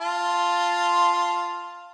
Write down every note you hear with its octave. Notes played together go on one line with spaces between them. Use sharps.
F4 A5 C6